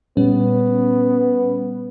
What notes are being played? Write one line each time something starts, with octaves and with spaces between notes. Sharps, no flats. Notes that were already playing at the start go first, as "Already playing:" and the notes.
A#2 G3 B3 C#4